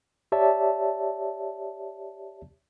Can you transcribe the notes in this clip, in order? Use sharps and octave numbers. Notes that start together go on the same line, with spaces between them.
G4 C#5 D5 E5 A5